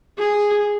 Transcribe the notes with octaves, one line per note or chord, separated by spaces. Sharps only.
G#4